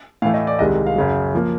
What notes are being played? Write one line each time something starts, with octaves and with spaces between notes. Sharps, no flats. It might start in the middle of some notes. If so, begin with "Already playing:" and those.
A2 E3 A3 F5
D#5
D5
C2 C3 D#3 G#3 D#5
F5
F#2 C#3 F#3
F3 A#3